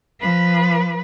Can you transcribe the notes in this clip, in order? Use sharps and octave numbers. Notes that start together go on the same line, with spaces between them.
F3 B4